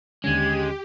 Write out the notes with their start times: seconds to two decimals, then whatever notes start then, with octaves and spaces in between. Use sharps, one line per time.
0.24 D#2 D3 G#3 C#4 G4 G#6